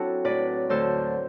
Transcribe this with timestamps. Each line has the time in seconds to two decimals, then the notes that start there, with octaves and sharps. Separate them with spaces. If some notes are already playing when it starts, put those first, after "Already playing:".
Already playing: F#3 C4 D4 E4 F#4 A4
0.24 A2 F#3 B4 D5
0.69 D2 D3 F#3 A4 C5